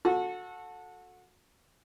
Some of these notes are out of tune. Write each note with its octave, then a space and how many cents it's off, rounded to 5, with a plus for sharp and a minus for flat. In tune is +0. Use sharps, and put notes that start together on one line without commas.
F#4 -25 A4 +0